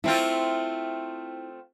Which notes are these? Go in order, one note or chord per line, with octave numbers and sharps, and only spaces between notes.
A3 C4 E4 F4 C5